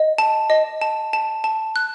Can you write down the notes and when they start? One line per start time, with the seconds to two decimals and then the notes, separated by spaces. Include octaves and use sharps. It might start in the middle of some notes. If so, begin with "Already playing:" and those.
Already playing: D#5
0.18 A5
0.50 D#5
0.81 A5
1.13 A5
1.44 A5
1.76 F#6